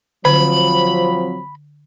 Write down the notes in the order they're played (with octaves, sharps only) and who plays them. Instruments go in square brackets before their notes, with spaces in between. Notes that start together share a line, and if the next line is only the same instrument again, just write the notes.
[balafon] D3 [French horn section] F3 F#3 C4 [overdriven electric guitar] B5